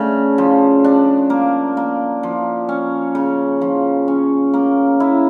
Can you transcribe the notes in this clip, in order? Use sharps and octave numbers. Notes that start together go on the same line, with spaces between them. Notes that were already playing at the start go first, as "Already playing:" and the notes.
Already playing: C#3 A3 D4
F3
D4
A#3
A#3
F3
C#4
C#3
F3
C#4
A#3
E4